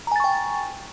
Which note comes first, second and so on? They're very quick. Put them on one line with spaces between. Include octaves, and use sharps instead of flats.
A#5 G#5 A6 C#6 G5